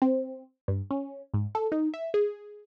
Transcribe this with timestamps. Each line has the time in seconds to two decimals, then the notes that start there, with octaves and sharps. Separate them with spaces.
0.02 C4
0.68 G2
0.91 C#4
1.34 G#2
1.55 A4
1.72 D#4
1.94 E5
2.14 G#4